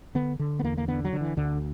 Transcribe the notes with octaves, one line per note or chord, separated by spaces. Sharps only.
D3 B3
D3
B3
E2 A#3
A#3
D3 B3
F#3
D3
E3
D2 D3